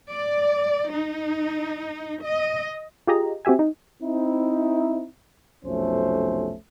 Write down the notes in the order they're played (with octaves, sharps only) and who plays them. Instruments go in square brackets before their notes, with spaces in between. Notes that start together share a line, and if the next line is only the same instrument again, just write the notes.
[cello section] D5
D#4
D#5
[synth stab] F4 G4 G#4 D#5 A#5
C4 F#4 G4 E5 G#5
D#4
[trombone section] C4 D#4 E4
B1 F2 C3 A3 C#4 C5